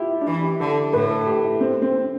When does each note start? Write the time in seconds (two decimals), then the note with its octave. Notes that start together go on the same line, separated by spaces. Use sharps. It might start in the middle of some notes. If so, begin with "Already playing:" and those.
Already playing: E4 F4 G4
0.21 D4
0.27 E3 E4
0.43 G4
0.60 D3 A4
0.93 A2 B4
1.10 A4
1.26 G4
1.44 E4
1.61 C4
1.72 C4
1.82 C4
1.93 C4